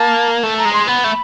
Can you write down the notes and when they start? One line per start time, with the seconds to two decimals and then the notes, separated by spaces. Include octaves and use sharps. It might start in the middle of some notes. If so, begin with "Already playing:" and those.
Already playing: A#3 A5
0.43 A3 A5
0.58 A#5
0.65 G#3
0.73 C6
0.87 B3 B5
1.04 A3